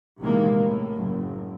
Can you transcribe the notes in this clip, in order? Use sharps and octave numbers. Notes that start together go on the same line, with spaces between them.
A#1 C3 D#3 E3 G#3 A#3
A2
F#1